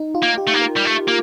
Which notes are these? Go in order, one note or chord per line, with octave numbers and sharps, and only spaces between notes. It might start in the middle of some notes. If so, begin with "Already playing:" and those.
Already playing: D#4
F4
A#3
G4
A3
A#3
A#4
G3
A3
A#3